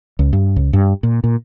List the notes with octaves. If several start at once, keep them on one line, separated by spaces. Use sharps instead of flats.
C#2
G2
C#2
G2
A#2
A#2